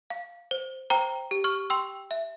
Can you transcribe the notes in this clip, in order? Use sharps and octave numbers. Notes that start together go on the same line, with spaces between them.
F5
C5
C5 G5 A#5
G4
C#6 F6
G5 C6 E6
E5